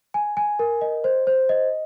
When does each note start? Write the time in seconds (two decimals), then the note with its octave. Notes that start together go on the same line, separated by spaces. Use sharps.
0.14 G#5
0.37 G#5
0.59 A#4
0.81 D#5
1.04 C5
1.27 C5
1.49 D#5